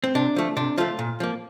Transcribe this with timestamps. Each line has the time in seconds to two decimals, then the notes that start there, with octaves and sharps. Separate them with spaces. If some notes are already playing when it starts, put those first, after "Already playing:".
0.04 C4
0.15 C3 D4
0.36 F3 A3
0.57 C3 D4
0.78 F3 A3 F4
0.99 A#2
1.20 F3 A#3